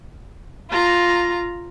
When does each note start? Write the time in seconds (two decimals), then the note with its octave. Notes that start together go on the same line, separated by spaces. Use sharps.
0.71 F4 A#5